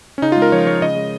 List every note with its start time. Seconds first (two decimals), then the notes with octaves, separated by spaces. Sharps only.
0.18 C#4
0.22 C#3 D#4
0.32 F4
0.37 G#3
0.42 A#4
0.52 F3 C#5
0.67 G#3 C#5
0.82 C#3 D#5
0.96 G#3